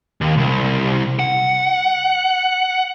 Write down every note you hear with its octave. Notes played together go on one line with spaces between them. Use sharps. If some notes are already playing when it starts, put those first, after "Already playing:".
D#2
C2
F#5